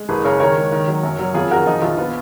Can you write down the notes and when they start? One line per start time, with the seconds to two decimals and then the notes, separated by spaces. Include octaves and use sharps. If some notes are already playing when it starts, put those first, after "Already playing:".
Already playing: G#3
0.09 F#1 G#4 B4
0.24 C#3 A#4 C#5
0.40 D#3 A#4 C#5
0.56 G#3
0.72 D#3
0.88 F#3
1.03 F#2
1.19 F#3
1.34 F2 F4 G#4
1.50 D#3 F#4 A#4
1.66 F3 D#4
1.82 A#1 F4
1.98 B3 F4